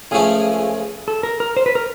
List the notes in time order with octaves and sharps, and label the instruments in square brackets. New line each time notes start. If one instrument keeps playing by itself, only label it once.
[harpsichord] C#2 C#3 F3 A3 C#4 [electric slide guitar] G#4
[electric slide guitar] A4
A#4
A#4
C5
B4
A#4